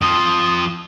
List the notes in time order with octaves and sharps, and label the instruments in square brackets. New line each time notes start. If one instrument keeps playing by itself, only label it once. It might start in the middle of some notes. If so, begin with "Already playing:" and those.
[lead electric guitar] F2 F3 [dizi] D#6